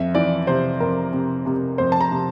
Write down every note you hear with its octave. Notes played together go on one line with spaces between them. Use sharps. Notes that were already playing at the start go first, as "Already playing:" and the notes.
Already playing: F2 E5
E3 D5
C3 C5
F2 A#4
C3
C3
F2 C5
A5
A#5
C3